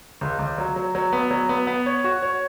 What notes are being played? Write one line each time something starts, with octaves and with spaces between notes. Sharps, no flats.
C#2
C#2
F#3
F#3
F#3
B3
F#3
B3
B3
C#5
F#4
C#5